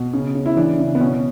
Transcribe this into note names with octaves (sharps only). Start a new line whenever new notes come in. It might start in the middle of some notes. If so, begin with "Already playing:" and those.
Already playing: B2
C#3
C#3
E4
E3 D4
C#3
B3
B2 C#4